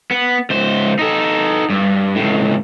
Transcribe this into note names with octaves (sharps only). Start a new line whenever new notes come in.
B3
C#2 C5
D#4 A4
G2
C#2 A2